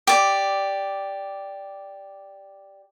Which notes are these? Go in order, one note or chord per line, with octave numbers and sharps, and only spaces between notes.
G4 D5